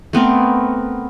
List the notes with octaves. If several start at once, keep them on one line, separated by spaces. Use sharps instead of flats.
A3 B3 C4 A#4